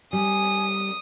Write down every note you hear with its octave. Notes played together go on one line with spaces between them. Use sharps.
G3 G#5 D#6